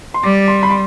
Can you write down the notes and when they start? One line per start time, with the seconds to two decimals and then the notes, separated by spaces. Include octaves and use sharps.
0.14 C6
0.24 G3 D6
0.48 C6
0.63 B5
0.70 C6